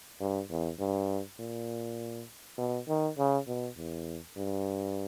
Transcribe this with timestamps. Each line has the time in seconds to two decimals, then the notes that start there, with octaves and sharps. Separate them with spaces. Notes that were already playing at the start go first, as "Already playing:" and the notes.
0.20 G2
0.50 E2
0.79 G2
1.40 A#2
2.58 B2
2.88 D#3
3.18 C#3
3.47 B2
3.77 E2
4.37 G2